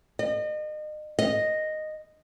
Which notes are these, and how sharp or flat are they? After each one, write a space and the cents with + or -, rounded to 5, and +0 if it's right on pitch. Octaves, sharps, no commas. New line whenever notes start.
D#5 -35
D#5 -5